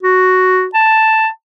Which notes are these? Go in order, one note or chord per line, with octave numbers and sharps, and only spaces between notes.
F#4
A5